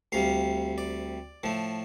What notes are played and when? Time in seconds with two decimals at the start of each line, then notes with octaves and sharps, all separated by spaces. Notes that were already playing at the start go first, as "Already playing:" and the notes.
0.12 D2 C3 G3 F5
0.78 D5
1.43 A2 F3 A3